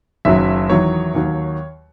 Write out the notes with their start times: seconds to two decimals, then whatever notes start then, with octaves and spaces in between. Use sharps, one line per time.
0.25 F#1 F#2 D#3 F#3 E5
0.70 E2 D#3 F#3 C#5
1.15 D#2 D#3 F#3